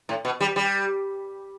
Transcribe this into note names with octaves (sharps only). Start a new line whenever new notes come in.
A2
B2
G3
G3